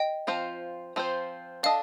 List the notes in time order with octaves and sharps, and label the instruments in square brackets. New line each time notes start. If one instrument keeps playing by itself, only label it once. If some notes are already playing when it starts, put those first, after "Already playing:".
Already playing: [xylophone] D#5 G5
[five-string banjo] F3 C4 F4 C5
F3 C4 F4 C5
[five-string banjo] D4 A4 D#5 [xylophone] F5